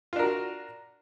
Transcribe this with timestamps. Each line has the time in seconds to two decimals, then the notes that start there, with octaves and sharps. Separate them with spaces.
0.13 F4
0.16 D4
0.19 A#4
0.23 F#4